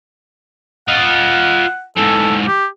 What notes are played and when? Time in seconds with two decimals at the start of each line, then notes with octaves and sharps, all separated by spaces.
0.88 F4 D#5 F#5
1.97 G#2 E3 A4
2.47 G4